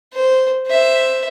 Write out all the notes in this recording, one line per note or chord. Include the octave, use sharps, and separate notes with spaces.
C5
C5 E5